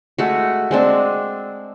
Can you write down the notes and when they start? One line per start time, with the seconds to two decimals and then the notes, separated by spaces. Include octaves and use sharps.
0.18 G#3 A3 F#4
0.71 G#3 C4 D4